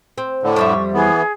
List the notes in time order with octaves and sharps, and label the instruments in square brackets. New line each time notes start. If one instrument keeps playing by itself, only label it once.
[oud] C4
[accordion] A2 D3
[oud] F2 G3 E5 [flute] C#6
[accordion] E3 B3 [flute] G#4